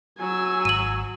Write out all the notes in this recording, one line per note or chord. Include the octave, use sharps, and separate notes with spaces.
F#3 G#5 E6
G#1 D#7 F#7